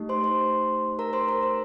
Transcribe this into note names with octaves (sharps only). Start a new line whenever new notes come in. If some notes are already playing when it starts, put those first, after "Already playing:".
Already playing: A3 D#4 G4
C5 C6
C5 C6
A#4 A#5
C5 C6
A#4 A#5
C5